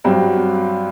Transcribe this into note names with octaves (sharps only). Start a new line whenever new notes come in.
G2 F#3 C4